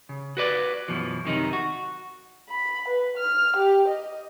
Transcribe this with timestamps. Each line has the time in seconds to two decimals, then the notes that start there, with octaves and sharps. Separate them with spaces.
0.09 C#3
0.37 F#4 B4 D5
0.88 F#2 B2 E3 F3
1.25 F#2 C3 D#3 D#4
1.53 F#4
2.49 B5
2.88 B4
3.17 F6
3.56 G4
3.88 D#5